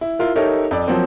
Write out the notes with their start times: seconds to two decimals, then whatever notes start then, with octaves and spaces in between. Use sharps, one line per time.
0.01 E4
0.19 E4 F4 A#4
0.36 D#4 G4 A4 A#4 C#5 E5
0.71 F2 D5
0.88 F3 F#3 A#3 C4